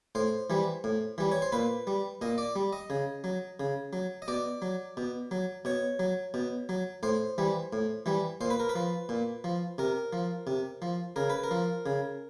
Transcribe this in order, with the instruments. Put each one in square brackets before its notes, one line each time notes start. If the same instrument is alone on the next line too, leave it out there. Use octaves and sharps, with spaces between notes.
[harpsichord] A2 C5
E3 G3
A2
E3 G3
C#5
C5
A#2 B4
G3
A#2 D#5
D5
G3
D#5
C#3
F#3
C#3
F#3
D#5
B2 D5
F#3
B2
F#3
B2 C#5
F#3
B2
F#3
A2 C5
E3 G3
A2
E3 G3
A#2 C5
B4
A#4
B4
F3
A#2
F3
C3 A#4
F3
C3
F3
C#3 A#4
B4
A#4
F3
C#3